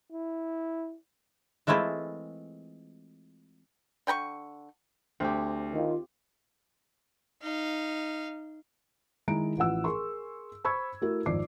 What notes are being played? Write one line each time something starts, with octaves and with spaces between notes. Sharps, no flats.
E4
E3 G#3 A3 C4 E4 F4
D3 G5 A#5 C#6
D2 C4 G4
D#3 F4
D#4 F5
D#3 G#3 E4 A#5 D7
A1 E3 F3 F#5 E6
G#4 A#4 C6 C#6
C5 B5 C#6 E6 G#6
A3 E4 F#4 A#4
G#1 F2 D5 D6 C7